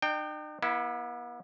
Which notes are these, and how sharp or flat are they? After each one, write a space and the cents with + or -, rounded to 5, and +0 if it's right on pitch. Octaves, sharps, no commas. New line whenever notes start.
D#4 -45 G5 +0
B3 -40 E4 -5